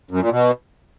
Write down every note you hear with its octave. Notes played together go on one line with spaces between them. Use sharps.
F#2
A#2
B2